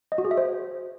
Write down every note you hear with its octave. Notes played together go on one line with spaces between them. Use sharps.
D#5
F#4
G#4
E5
C5